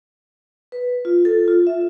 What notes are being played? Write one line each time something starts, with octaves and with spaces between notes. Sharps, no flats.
B4
F4
A4
F4
E5